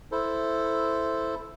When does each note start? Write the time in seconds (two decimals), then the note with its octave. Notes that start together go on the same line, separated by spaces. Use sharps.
0.12 E4 A4 C5